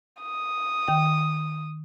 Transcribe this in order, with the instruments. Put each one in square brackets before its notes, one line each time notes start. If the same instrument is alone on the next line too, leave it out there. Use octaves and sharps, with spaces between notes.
[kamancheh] D#6
[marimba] D#3 G5